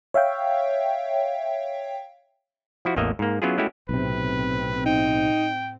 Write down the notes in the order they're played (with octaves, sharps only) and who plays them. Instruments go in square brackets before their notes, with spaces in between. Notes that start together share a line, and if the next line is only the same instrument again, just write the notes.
[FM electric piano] C#5 E5 F5 G5
[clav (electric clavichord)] F3 E4 F#4
A1 E2 A#3 D#5 E5
G#2 A#3
F#3 B3 C#4 E4 F4 G#4
G#3 A3 C#4 E4 F#4 G4
[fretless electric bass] B1 C3 [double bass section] A2 C4 [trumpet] B4
[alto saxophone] D#4 [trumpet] G5